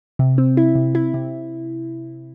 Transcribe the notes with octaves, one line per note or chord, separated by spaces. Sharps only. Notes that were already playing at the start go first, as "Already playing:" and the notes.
C3
C4
E4
C3
E4
C3